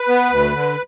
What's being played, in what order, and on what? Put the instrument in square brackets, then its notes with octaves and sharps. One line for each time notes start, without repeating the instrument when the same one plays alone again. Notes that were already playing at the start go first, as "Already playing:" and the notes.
Already playing: [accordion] B4
B3
D2
D3